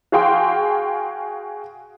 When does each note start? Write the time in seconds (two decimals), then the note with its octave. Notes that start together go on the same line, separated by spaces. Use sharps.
0.12 F#4 G#4 F5 G5 C6